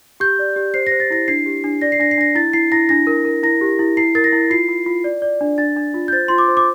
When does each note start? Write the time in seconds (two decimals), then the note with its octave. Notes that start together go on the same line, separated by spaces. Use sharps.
0.20 G4 G6
0.39 D5
0.56 G4
0.74 C5 C7
0.87 A#6
0.92 C5
1.00 A6
1.10 E4 A#6
1.28 D4 C7
1.46 G4
1.64 D4
1.81 D5 A#6
1.92 C7
2.00 D4 A#6
2.11 C7
2.18 D4 A#6
2.35 E4 A6
2.53 E4 C7
2.72 E4 A#6
2.89 D4 A#6
3.07 A#4
3.25 A#4
3.43 E4 A#6
3.61 G4
3.79 E4
3.97 E4 C7
4.15 A#4 A6
4.24 A#6
4.33 E4
4.50 F4 C7
4.68 F4
4.86 F4
5.04 D5
5.22 D5
5.41 D4
5.58 D4 A6
5.77 D4
5.94 F4
6.08 G6
6.13 C5 A6
6.28 F4 C6
6.38 D6
6.48 C5
6.57 D6